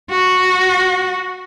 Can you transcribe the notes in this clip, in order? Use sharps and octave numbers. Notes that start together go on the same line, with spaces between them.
F#4